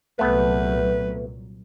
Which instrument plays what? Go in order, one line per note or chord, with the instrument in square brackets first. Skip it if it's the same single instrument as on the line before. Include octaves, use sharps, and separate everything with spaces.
[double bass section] C2 A#2 F#3 [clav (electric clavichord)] A3 B3 [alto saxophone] B4